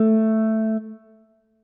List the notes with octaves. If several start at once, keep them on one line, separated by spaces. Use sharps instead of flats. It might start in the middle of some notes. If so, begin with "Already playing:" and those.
Already playing: A3